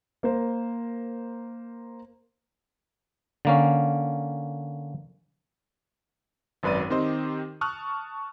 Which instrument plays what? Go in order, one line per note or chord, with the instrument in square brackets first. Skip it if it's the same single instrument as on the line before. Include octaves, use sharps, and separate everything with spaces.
[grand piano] A#3 A#4 C5
[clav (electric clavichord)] D3 A#3 C#4
[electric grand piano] G#1 F#2 B4 D5 D#7
D#3 C4 G4 C5 D#5
A5 C#6 D#6 F6 F#6